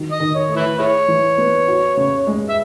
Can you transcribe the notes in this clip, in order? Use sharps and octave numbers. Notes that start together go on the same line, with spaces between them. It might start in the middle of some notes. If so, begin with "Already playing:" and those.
Already playing: D#3 F#3
D#5
D#3
C#5
A3
E4 B4
E4 G#4 C#5
E3
B3
F#4
C#3
G#3
E5